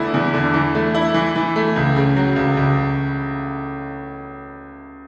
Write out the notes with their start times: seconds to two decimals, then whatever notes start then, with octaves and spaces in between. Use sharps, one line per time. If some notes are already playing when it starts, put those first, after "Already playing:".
Already playing: E2 D3 A3 E4
0.14 E2
0.34 D3
0.54 E3
0.75 A3
0.95 E4
1.14 E3
1.36 E3
1.56 A3
1.76 C#2
1.96 C#3
2.16 F#3
2.36 C#2
2.57 C#2